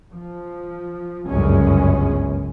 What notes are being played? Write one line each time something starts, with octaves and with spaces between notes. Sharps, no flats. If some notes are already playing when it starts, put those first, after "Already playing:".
F3
G1 C#2 F#2 G#3 C#4